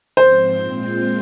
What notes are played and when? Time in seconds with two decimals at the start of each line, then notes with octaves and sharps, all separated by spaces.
0.17 G#2 F3 C4 C5
0.58 A#2 G#3 C4 F4